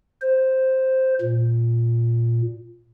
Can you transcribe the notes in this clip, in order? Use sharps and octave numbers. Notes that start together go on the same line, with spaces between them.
C5
A#2